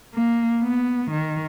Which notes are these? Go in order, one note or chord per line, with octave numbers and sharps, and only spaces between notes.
A#3
B3
D#3